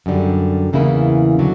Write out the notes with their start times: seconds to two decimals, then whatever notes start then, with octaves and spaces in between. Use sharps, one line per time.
0.06 F#2 D3 G3
0.73 E2 C#3 E3 A#3 E4
1.39 D3 F#3